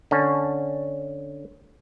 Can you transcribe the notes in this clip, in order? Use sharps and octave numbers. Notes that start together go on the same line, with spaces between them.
D3 C#4